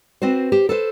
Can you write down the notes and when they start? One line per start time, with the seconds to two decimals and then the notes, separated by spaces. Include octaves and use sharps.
0.22 C4 F#4 B4 C5
0.52 G4 C5
0.69 A4 B4 C5